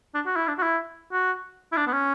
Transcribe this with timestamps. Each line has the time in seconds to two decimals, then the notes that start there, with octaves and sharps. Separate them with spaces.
0.15 D4
0.26 F#4
0.36 E4
0.48 D4
0.59 F#4
0.63 E4
1.12 F#4
1.72 E4
1.77 D4
1.87 B3
1.93 C#4